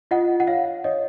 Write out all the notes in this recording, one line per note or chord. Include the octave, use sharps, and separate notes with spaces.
F4 D#5 F#5
F#5
C#5 F5
C#5 D#5